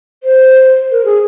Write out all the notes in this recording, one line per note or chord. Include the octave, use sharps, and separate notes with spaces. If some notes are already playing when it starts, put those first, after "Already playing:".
C5
A#4
G#4